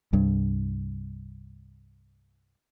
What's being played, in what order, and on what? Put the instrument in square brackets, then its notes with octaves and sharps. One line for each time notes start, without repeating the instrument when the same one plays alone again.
[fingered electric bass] C2 G2